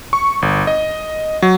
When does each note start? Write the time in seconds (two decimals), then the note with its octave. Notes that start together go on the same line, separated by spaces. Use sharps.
0.13 C#6
0.42 G1
0.67 D#5
1.42 F#3